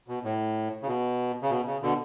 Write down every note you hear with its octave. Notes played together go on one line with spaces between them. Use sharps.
B2
A2
C#3
B2
C#3
B2
C#3
B2 D3